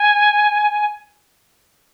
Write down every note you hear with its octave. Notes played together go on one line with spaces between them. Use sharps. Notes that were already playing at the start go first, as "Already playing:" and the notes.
Already playing: G#5